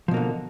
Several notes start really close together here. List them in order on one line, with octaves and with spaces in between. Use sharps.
F3 B2 A#3 D3